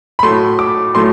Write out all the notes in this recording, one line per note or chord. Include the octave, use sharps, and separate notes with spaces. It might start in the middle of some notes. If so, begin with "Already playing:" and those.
B5
A2 F#3 A3 C6
D6
A2 F#3 A3 C6